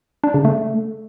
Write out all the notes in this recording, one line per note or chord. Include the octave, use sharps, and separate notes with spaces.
D4
C#3
A3